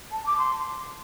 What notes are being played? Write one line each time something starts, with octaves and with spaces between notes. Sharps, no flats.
A5
D6
C6